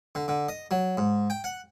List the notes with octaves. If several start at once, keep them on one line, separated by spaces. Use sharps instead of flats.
D3
D3
D#5
F#3
G#2
G5
F#5